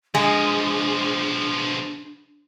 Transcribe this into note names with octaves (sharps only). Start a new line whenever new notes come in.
B2 F3 G#3 D4